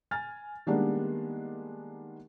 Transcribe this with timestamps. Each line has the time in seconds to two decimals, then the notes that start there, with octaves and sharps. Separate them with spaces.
0.11 G#5 F6 A6
0.67 D#3 G3 G#3 A#3 B3 D4